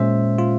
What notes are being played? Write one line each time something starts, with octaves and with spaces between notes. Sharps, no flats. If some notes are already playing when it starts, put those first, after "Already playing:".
Already playing: A#2 G#3 C#4 C5 E5
F4